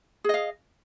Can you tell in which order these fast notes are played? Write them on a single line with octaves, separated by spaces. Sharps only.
G#4 D#5 F5